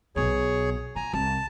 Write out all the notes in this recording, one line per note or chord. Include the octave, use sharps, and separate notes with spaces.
B1 B2 G#4 C#5
F3 G#5 A#5
C2 A5